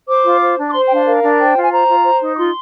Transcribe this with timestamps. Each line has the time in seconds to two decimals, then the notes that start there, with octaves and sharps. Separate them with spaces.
0.08 C5 D6
0.25 F4
0.42 C5
0.58 D4
0.69 D6
0.73 C5 C6
0.87 G5
0.91 D4
0.96 F5
1.06 A#4 F5
1.23 D4
1.39 C5 G5
1.56 F4
1.64 G#5
1.71 C5 A#5
1.88 F4
2.04 C5
2.21 D#4
2.34 D6
2.37 F4 C6